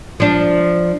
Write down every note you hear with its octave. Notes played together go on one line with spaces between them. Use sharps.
F3 D4